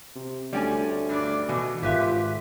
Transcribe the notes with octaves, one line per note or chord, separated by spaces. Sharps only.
C3
D2 G3 A3 C#4 D5 G5 G#5
G2 D4 D5
B2 E3 F#4 D#5 G#5
G#1 F4 G4 B4 E5